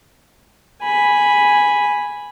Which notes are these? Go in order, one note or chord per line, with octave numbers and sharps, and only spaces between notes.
G#5 B5